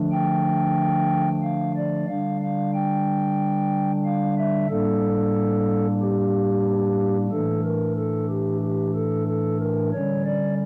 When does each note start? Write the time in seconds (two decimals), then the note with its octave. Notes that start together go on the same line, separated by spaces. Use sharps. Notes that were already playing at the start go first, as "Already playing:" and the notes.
Already playing: D3 F3 A3 D4
0.12 G5
1.43 F5
1.76 D5
2.08 D3 G3 D4 F5
2.41 F5
2.74 G5
4.05 F5
4.38 E5
4.69 A2 G3 A#3 D4 A4
6.00 G4
7.31 A2 E3 A3 D4 A4
7.63 A#4
7.97 A4
8.29 G4
8.61 G4
8.95 A4
9.28 A4
9.60 A#4
9.93 D3 G3 C#4 C#5
10.25 D5